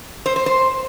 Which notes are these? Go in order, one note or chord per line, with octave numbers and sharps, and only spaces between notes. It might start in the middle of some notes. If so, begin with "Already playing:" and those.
C5
C5
C5